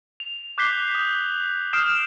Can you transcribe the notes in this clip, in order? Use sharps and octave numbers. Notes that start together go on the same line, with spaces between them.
F7
D6 F#6 G6 B6 C7 G7
D#6
D#6 F6 G6 C7 D7 E7